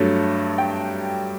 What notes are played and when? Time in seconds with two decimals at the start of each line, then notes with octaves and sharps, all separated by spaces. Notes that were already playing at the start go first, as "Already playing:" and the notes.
Already playing: G2 F#3 A3 D4
0.58 G5